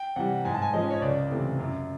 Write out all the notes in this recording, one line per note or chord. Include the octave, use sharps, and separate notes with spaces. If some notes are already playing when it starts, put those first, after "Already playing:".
Already playing: G5
C3 E3 G3 F#5
G#2 G#5
A5
G#5
F3 G#3 C#4 D#5
C#5
C#2 D5
C3 E3 A3
F#2